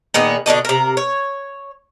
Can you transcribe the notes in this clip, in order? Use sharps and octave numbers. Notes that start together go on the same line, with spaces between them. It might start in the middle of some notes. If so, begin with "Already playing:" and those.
A#2 D#3 B3 G#4
B2 D3 D4 D#5
C3 A#4
C#5